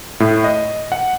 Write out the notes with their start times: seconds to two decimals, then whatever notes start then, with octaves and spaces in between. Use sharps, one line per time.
0.20 A2
0.44 D#5
0.92 F#5